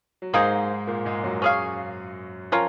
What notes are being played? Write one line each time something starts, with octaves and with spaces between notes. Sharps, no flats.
F#3
G#2 G#3 A#3 D#4 G#4 C5
A#2 A#3
G#2 G#3
F#2 F#3
C#4 G#4 C#5 F5
F3 C#4 F4 A#4